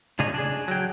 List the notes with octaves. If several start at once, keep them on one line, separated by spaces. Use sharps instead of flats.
A2 C#3 D4 G#4 C#5 D#5
D4 G#4
F#3 G5